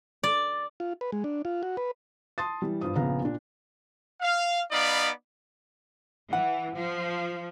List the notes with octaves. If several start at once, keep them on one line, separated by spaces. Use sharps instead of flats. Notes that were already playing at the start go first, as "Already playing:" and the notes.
D5
F4
B4
G#3
D4
F4
F#4
B4
A5 C6 D#6 A6
E3 G3
G2 F4 C5 D#6
A#1 C#3 B3 F5 A#5
A#2 D4
F5
B3 D#4 D5 F5 B5 D6
E3 F#5
F3